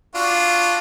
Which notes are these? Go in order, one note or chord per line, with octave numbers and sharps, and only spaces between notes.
D4 F4 F#4